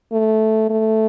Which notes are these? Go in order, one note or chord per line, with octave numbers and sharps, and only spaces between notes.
A3
A3